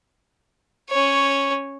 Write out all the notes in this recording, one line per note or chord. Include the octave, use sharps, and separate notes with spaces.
C#4 C#5